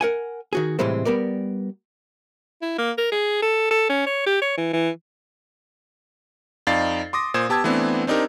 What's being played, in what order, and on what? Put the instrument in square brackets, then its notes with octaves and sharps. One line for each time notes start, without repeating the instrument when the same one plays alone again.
[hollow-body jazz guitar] A#4 F#5 G#5
D#3 F#4 G#4
A2 C3 E3 G3 G#3 C4
G3 B3 A#4 D5
[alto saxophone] E4
A#3
A#4
G#4
A4
A4
C#4
C#5
G4
C#5
E3
E3
[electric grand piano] F2 D#4 D5 F5 A6 C7
C6 D6 D#6 A#6
A#2 C5 D#6 G#6 E7
B3 G4 A5 E6 G#6
E3 A3 B3 C4 D4
C4 D4 D#4 G4 A#4